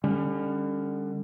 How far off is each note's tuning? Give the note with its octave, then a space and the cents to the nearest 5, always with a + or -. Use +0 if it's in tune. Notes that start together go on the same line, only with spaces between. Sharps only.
D3 +30 G3 +40 C#4 +5